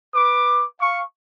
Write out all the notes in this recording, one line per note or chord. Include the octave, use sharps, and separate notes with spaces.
B4 D6
F5 C#6